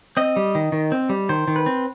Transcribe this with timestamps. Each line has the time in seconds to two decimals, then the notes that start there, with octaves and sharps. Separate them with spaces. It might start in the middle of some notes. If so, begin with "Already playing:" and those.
0.17 C4 D#5
0.36 G3
0.55 D#3
0.72 D#3
0.92 C4
1.09 G3
1.29 D#3 C5
1.48 D#3
1.56 B4
1.66 C4